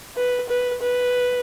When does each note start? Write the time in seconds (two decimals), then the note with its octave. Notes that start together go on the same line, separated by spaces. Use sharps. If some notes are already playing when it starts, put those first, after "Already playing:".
0.17 B4
0.49 B4
0.82 B4